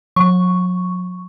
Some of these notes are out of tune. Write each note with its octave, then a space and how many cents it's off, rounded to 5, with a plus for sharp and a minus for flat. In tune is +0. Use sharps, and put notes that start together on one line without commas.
F#3 -35 C#6 +0